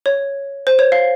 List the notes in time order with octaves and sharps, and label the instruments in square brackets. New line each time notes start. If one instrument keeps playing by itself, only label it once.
[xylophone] C#5
C5
C#5
F5